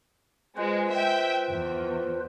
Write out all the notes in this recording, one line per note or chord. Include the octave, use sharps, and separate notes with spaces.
G#3 F4 B4 C5
E5 G5
E2